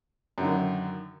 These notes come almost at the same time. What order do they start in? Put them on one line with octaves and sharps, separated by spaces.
F#2 D3 D#3